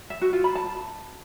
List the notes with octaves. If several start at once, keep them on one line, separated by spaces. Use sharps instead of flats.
E5
F#4
F4
B5
A5